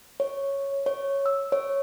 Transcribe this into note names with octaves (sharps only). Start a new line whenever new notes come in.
C#5
C#5
E6
C#5